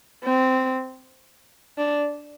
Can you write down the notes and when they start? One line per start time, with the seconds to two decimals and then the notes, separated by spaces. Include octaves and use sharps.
0.24 C4
1.78 D4